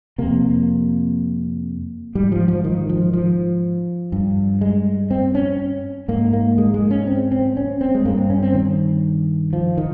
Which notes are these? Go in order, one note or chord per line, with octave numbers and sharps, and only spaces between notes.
F2 C3 A#3
G#2 G3
F3
F3
D#3
F3
F3
G2
G#3
C4
C#4
G#2 A#3
A#3
G#3
G#3
C#4
C4
C4
C#4
C4
G#3
G2 A#3
C4
C#4
C4
D#3
F3
D#3